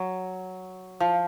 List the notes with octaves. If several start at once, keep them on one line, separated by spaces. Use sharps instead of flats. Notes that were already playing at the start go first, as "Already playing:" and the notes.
Already playing: F#3
F3